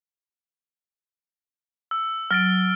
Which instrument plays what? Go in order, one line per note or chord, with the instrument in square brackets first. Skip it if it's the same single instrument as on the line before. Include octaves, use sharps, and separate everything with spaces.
[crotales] E6
[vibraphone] F#3 [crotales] F6 A6 D7